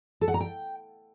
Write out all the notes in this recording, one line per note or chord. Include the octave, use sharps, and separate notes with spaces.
A4
F#5
A#5
G5